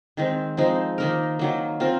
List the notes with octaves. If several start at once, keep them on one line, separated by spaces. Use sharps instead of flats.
D#3 G#3 C4
F3 G#3 C4 D#4
D#3 A#3 D#4 A#4
D#3 F#3 A#3
C4 F4 A#4